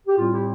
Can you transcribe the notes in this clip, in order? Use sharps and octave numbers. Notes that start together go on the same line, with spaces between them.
G4
A2 G3 C4 F4
E4 G4